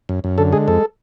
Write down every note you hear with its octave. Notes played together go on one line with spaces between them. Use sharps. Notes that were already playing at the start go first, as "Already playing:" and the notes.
F#2
F#2
D3 A4
G#3 G#4
F2 A4